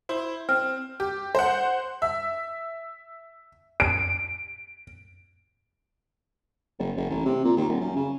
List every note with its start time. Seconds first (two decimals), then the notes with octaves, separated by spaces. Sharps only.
0.09 E4 C5
0.49 C4 F6
1.00 G4
1.35 C5 F#5
2.02 E5
3.80 D7
6.79 F#1
6.96 F#1
7.10 A1
7.25 C3
7.44 A#2
7.57 D#2
7.69 D#1
7.81 F#2
7.96 C#3